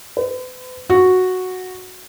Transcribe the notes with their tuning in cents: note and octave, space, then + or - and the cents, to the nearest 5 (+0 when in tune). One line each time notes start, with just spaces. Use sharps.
B4 +45
F#4 -5